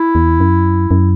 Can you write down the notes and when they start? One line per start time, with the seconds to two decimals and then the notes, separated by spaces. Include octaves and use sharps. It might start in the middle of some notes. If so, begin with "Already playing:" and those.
Already playing: E4
0.15 E2
0.40 F#2
0.91 F#2